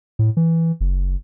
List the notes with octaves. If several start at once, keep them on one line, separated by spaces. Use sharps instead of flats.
A2
E3
F#1